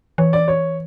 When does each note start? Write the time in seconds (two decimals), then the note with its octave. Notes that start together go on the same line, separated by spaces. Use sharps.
0.18 E3 C#5
0.33 D5
0.48 C#5